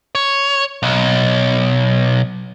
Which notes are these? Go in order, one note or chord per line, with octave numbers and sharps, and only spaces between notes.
C#5
B1